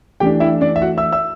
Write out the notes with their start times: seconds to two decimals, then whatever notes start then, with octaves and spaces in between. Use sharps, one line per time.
0.20 E3 A3 D4 G4 G5
0.40 E4 E5
0.61 D4 D5
0.76 E5
0.82 F#4 F#5
0.97 E5 E6
1.12 E5 E6